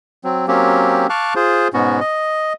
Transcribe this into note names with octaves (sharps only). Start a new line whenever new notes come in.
F#3 C4
F#3 A#3 C4 C#4 G4
F5 A5 C#6 D6 F6 F#6
F4 G#4 C5
G#2 B2 B3 C#4 F#4
D#5